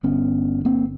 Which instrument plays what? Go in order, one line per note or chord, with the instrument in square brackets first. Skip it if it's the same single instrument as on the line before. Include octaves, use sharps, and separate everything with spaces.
[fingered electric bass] G1 G2 D3 B3 C#4
A#3 C4